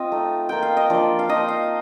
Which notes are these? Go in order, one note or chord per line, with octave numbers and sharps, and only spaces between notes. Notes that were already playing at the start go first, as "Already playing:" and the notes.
Already playing: C4 F4 D#5
A3 D#4
A#3 F4 G5
F5
D#5
F3 A#3 D4 F4 D5
F5
F3 A#3 D#4 D#5
F5